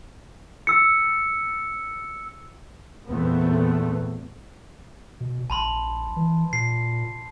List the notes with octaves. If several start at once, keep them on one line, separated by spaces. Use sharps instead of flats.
E6 C#7
E2 A#2 A3 B3 C4
B2
A#1 A5 B5 C6
E3
A#2 C7